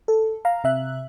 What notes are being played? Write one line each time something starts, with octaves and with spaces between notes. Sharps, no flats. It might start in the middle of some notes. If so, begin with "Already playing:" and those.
A4
F5 A#5
C3 E5 F#6